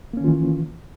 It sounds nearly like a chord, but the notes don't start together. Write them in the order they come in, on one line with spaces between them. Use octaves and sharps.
A#3 C#4 D#3 F4 E3